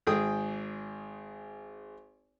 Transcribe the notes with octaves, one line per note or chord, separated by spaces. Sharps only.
G#1 G#4 G5 D#6